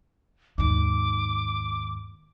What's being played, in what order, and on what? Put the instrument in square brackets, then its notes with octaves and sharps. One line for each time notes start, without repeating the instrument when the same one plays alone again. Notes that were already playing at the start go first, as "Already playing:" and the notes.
[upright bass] D#2 G#2 [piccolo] D6